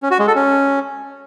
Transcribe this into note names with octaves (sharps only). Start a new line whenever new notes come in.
C#4
F#4
G#3
A4
C#4